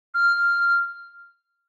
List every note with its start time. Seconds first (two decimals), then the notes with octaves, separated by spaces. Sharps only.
0.14 F6